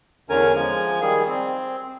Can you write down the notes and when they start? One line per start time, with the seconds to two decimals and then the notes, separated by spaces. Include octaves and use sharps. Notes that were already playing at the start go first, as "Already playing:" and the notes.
0.30 E2 D3 C#4 A#4 G#5
0.54 F3 G#3 G#5
1.01 D#3 G3 G#4
1.28 C4